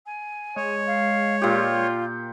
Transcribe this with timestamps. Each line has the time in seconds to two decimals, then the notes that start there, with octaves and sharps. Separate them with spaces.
0.06 G#5
0.56 G#3 C#5
0.86 F5
1.41 A#2 F4 G4